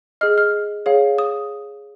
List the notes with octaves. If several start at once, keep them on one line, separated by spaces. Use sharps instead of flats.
G#4 D#5 F6
F6
G#4 C#5 F5
D#6